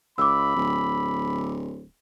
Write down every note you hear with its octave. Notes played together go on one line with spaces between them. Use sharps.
C#2 B5 D6 E6
D1